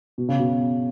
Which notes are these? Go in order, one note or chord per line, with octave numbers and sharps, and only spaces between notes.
B2
C#3
B2